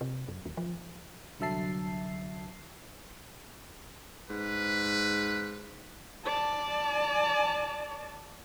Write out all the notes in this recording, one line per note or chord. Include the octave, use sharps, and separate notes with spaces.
C3
F#2
D#2
F3
C2 D3 F#3 E5 A5 C7
G#2 B4
D5 A5